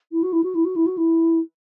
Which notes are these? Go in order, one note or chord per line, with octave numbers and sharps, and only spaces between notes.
E4
F#4
E4
F#4
E4
F#4
E4
F#4
E4